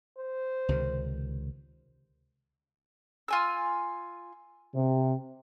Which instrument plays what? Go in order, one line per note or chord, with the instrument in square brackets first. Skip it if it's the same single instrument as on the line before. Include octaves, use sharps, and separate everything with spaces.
[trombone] C5
[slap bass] C#2 C3 D#3
[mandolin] F4 G#5 E6
[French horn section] C3